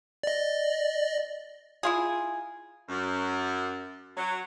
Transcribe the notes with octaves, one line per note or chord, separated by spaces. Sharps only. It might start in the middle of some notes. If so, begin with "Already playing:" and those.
D5 D#5
E4 F4 G#4
F#2
F#3